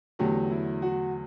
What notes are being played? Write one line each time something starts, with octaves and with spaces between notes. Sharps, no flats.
E2 D3 F#3 A3 G4
E4
F#4